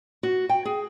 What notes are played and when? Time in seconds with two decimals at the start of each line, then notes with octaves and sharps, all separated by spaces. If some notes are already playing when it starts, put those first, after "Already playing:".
0.23 F#4
0.49 G5
0.65 G#4